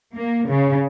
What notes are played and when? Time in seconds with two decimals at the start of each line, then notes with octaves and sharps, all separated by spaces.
0.16 A#3
0.49 C#3